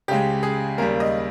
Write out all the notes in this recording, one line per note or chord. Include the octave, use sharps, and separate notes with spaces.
C#2 C#3 G#3 G4
G#4
D#2 C#3 G3 A#4
D#5